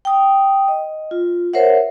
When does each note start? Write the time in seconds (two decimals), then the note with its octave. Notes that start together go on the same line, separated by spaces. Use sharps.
0.05 G5 D#6
0.68 D#5
1.11 F4
1.53 A#4 C5 C#5 E5 F#5